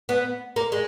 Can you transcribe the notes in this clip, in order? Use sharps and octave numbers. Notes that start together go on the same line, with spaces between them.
B3
A#3
G#3